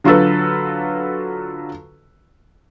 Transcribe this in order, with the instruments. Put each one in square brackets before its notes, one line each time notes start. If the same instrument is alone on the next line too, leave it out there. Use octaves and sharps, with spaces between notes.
[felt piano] D3 F#3 F4 F#4 A4 B4